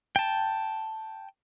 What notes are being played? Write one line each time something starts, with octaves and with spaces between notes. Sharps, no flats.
G5 A5